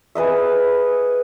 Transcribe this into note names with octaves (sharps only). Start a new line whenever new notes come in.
G#4 B4 D#5 E5